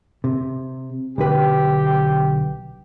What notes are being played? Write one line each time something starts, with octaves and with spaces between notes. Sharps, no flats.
C3
B1 D3 G4 B4